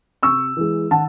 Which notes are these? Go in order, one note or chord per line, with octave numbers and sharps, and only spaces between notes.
C3 C#6 E6
E3 G#3
D#3 F#5 A5